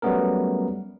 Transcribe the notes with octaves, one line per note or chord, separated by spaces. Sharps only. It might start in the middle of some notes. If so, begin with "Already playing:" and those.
F#3 G3 A3 B3 C#4 A#4